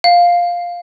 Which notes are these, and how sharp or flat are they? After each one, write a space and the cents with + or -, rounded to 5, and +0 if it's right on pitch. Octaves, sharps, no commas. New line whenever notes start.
F5 +5